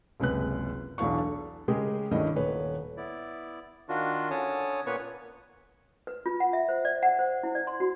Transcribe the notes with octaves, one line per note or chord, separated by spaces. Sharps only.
F#1 C#2 C3 B4 F#6
B1 E2 D4 E4 F5 C#6
A4
C#3 G#3 G4 G#4 A#4
D2 G2 D#3 C#4 E4 D#5
D#1 B4 C#5
B3 E4 D5
D#3 D4 F4 F#4
D3 C#4 C#5 A5 D#6
A#2 A#3 B3 B4 C#5 C#6
B4
F4
F#5
E5
C5
D5
F#5
C5
E4
D5
C6
F#4